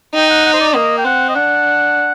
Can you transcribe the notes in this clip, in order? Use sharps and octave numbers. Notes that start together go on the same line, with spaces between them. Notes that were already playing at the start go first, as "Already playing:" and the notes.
D#4 G5
F#5
F#5
C5
D5
A#3 D#5
G5
C4 F#5
D#5
D4 F#5